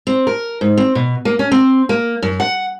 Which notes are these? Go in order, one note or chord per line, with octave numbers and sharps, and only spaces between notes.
C4
A#4
G#2
C4
B2
A#3
C#4
C4
A#3
F#2
F#5